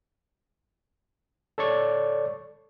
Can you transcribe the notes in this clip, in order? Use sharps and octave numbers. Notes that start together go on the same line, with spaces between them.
A4 C#5 D5 C#6